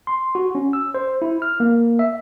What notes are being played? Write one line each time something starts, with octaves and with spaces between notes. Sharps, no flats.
C6
F#4
C#4
E6
C5
E4
F6
A#3
E5